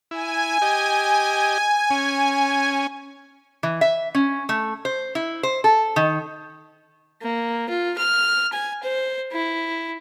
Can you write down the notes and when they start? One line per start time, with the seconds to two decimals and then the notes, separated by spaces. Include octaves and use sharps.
0.11 E4 G#5
0.62 G4 D#5
1.90 C#4
3.63 E3
3.81 E5
4.15 C#4
4.49 A3
4.85 C5
5.15 E4
5.43 C5
5.64 A4
5.96 D#3
7.22 A#3
7.69 F4
7.98 F6
8.53 G#5
8.83 C5
9.32 E4